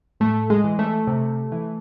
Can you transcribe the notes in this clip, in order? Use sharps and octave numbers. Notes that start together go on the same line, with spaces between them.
A2 A3
G#3
E3
A3
C3
E3